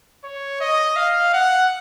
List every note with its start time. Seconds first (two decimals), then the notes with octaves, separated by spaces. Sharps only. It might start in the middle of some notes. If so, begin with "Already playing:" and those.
0.24 C#5
0.60 D#5
0.96 F5
1.33 F#5